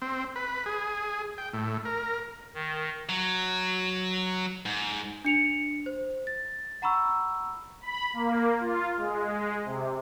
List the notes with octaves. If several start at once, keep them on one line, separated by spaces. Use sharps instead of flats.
C4
B4
G#4
G5
A2
A#4
D#3
F#3
G#2
D4 C#7 F7
C5
A6
F#5 A#5 B5 C#6 E6
B5
A#3
F4
G#3
C3